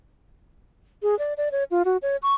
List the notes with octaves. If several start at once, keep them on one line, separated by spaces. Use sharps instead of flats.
G#4
D5
D5
C#5
F4
F#4
C#5
C#6